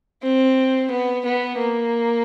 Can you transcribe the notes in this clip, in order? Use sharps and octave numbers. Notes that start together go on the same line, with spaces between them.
C4
B3
B3
A#3